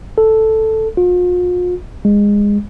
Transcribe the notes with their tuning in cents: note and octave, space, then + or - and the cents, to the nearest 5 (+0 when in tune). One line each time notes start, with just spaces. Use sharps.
A4 +0
F4 +40
G#3 -20